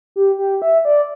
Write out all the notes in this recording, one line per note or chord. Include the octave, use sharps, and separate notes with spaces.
G4
G4
E5
D5